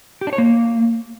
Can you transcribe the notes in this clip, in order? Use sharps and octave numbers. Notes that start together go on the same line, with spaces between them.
G4
D4
C#5
A#3